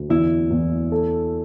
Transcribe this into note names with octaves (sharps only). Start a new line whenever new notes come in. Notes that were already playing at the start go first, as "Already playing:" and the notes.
Already playing: D2
E2 E4
E2
A4